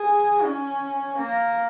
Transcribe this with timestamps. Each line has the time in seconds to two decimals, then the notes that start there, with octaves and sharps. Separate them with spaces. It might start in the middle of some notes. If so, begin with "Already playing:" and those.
Already playing: G#4
0.44 C#4
1.18 A#3